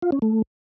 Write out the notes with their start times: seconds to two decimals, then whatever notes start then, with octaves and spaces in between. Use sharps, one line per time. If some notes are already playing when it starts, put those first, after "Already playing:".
0.02 F4
0.12 C#4
0.22 A3